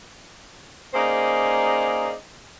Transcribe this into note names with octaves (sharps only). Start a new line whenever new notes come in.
A#3 C#4 D#4 G#4 C5 D5